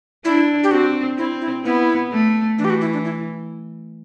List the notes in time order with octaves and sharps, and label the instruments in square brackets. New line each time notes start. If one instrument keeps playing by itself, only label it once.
[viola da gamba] D4 [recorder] E4
[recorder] G4
[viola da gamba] C4 [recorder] F#4
[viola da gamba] C4 [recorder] E4
[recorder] E4
[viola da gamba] B3 [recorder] E4
[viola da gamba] A3
[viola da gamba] E3 [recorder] D4
[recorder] G4
F#4
E4
D4
E4